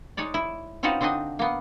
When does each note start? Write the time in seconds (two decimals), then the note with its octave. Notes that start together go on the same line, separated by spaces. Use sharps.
0.17 G#3 D#4 C#5 D5
0.34 E4
0.83 C4 C#4 D#4 F4 F#4 B4
1.01 D3 C4 D4 D#4 D#5
1.39 A#3 B3